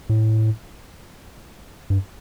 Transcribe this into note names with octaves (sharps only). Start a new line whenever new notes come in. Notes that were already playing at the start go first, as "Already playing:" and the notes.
A2
G2